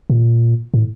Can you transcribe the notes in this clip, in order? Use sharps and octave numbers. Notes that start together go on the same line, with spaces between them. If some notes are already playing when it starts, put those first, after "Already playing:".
A#2
A2